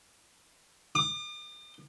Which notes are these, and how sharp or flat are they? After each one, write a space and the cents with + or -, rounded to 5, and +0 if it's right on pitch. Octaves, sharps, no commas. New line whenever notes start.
D6 +45